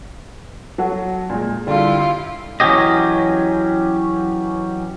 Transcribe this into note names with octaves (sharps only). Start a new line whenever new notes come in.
F#3 F#4 A4
A#2 G#3
D3 G3 E4 F4 G4
E3 F#3 G#3 C#4 G4 D#5